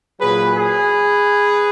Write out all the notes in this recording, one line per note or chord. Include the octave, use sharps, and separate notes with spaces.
A#2 F#3 G#4 B4
G#4 B4